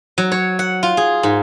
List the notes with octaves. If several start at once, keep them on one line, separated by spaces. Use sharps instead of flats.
F#3
C#5
F#5
F4
G#4
G#2